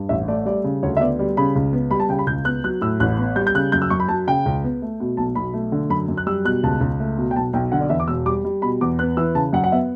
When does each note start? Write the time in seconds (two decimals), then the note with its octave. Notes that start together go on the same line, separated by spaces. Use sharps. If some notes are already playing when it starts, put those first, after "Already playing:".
Already playing: G2
0.09 A1 E5
0.28 A3 D5
0.45 G3 D5
0.64 C#3
0.83 D2 C#5
0.97 E5
1.01 B3 D5
1.19 G3 D5
1.37 C#3 B5
1.56 C#2
1.73 B3
1.91 G3 B5
2.00 A5
2.09 C#3 G5
2.19 B5
2.27 C#2 G6
2.45 B3 F#6
2.64 F#3 F#6
2.81 A2 E6
3.00 A1 F#6
3.18 B3
3.36 G3 G6
3.47 G6
3.55 C#3 F#6
3.72 F#2 G6
3.82 E6
3.90 F#2 C#6
4.00 B5
4.08 F#3 A5
4.27 C#3 G5
4.46 C#2
4.64 B3
4.82 A3
5.00 B2
5.17 B1 A5
5.35 B1 B5
5.54 A3
5.72 D3
5.90 F#2 B5
6.08 F#2
6.17 F#6
6.27 G3 E6
6.45 B2 F#6
6.64 C#2 A5
6.81 C#2
7.00 A3
7.18 B2
7.31 G5
7.36 B1 A5
7.53 B1 G5
7.72 D3 F#5
7.81 D5
7.89 E2 E5
8.00 D6
8.08 E1 E6
8.26 G3 D6
8.45 G3
8.62 B2 B5
8.81 E2 D6
8.99 B3 F#6
9.17 E3 E6
9.35 C#3 A5
9.53 F#2 F#5
9.64 F#5
9.72 B3 E5